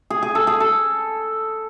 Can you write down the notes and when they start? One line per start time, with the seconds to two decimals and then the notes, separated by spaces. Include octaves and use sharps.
0.10 G#4
0.23 G#4
0.35 A4
0.47 G#4
0.60 A4